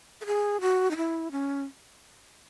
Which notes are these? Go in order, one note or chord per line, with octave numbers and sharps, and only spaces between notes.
A4
G#4
F#4
D#4
E4
C#4